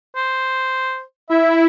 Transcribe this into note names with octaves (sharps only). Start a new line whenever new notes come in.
C5
E4 E5